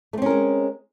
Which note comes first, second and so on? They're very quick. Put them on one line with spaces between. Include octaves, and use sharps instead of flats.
A3 C4 C#4 A#4 G#3